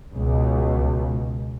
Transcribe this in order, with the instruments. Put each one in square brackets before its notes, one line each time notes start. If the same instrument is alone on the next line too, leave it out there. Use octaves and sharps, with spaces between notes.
[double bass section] C#2 B2